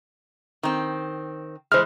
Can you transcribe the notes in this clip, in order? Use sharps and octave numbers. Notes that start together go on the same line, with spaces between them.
D#3 C4
E3 G#3 C5 F6